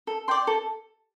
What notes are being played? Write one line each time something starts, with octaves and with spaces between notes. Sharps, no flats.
A4
D5 G5 C6
A4